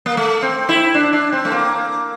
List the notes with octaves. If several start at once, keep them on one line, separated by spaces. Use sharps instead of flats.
A#3
A3
C4
E4
D4
D4
C4
A3
A#3